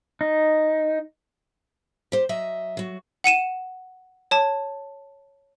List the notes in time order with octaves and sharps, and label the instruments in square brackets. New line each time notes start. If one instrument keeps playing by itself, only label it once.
[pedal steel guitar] D#4
[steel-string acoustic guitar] G4 C5
F#3 D#5 E5
F#3 F#4
[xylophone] F#5 C#7 D#7 E7
C#5 A5